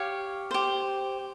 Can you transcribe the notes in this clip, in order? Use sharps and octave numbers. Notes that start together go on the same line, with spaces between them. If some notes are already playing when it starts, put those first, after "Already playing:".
Already playing: G4 C#5 F5
G4 C5